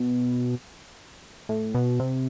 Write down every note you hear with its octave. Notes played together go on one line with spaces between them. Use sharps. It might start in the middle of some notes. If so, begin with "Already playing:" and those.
Already playing: B2
A2
B2
C3